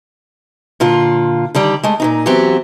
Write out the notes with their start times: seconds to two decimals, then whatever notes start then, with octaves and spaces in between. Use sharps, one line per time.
0.80 A#2 D3 F4
1.55 D3 D#3 G3 D5
1.84 G#3 A3
2.00 A#2 C#3 D#4
2.26 E3 F#3 B3 C4 G4